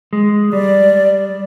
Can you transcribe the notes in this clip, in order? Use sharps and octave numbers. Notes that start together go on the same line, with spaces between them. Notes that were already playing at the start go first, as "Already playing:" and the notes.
G#3
G3 D5